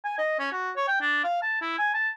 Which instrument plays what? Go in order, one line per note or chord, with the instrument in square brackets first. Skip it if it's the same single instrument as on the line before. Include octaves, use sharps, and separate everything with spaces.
[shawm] G#5
D#5
C#4
F#4
C#5
G5
D4
F5
A5
E4
G#5
A5